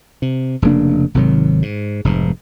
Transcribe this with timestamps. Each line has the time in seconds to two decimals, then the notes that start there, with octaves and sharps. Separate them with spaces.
0.22 C3
0.62 F1 C#3 A#3 D4
1.14 G#1 C3 D#3 F#3
1.62 G#2
2.05 F1 G#2